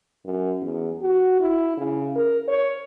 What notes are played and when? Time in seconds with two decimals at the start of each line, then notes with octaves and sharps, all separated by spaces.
0.25 F#2
0.61 E2
1.02 F#4
1.40 E4
1.77 C#3
2.16 A#4
2.48 C#5